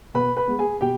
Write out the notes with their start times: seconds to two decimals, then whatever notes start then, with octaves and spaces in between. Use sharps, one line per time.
0.14 B2 B4 B5
0.37 B4 B5
0.48 G#3 B3
0.59 G#4 G#5
0.81 B2 G4 G5